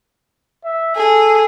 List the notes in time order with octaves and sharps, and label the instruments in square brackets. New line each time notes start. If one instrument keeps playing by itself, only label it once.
[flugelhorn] E5
[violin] G#4 [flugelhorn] A4